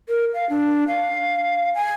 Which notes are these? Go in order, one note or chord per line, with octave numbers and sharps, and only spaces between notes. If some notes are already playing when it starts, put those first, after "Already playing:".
A#4
F5
D4
F5
G#5